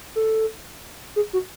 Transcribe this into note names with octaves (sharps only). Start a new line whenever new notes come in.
A4
G#4
F#4